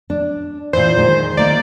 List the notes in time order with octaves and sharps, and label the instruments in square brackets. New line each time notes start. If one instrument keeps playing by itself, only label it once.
[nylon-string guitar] D4
[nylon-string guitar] A#2 E3 [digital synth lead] C5
[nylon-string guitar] D#3 G#3
[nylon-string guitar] D#3 A#3 D#5 [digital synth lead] D5